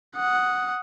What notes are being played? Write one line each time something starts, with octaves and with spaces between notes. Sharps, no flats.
F#5 D#6